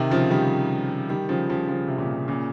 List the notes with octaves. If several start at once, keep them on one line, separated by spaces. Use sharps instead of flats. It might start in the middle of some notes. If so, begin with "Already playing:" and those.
Already playing: C3 D#3
C#3 F3
D#3 G3
D#3 G3
C#3 F3
C#3 F3
C#3 F3
C3
A#2 C#3
A#2 C#3